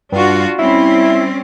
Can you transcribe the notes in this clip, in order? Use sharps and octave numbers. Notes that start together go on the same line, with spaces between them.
G2 D4 F4 F#4
G3 C4 C#4 E4